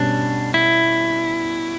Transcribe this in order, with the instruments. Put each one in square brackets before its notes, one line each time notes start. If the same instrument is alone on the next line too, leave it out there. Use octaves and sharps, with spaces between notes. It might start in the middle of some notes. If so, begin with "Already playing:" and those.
Already playing: [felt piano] B2 G3 C#4 [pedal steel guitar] D4
[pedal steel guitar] E4